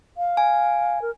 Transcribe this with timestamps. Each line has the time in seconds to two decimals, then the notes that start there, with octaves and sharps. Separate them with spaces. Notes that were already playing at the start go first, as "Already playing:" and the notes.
0.17 F5
0.37 G#5
1.02 A#4